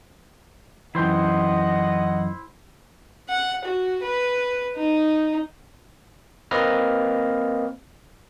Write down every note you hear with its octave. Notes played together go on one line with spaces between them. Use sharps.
F#2 E3 E4 C5 D#5 F#5 G5
F#5
F#4
B4
D#4
A#3 C4 B4 D#5 F6